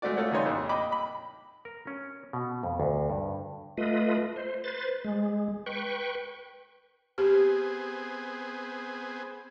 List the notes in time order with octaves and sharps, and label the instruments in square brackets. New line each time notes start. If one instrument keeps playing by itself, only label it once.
[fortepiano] G#3 A3 C4 F#4 D5
A3 F4 A4 C#5 F#5
C#3 G3 D#4 C#5 C6
A#1 F2 G3
D#5 G5 B5 D6
B5
[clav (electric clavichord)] A#4
C#4
B2
F2
D2
G2
[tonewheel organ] A3 F4 B4 D#5
C5
B4 C5 A6
G#3
B4 G5 C#6
[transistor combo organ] B3 C4 G#4 [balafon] G4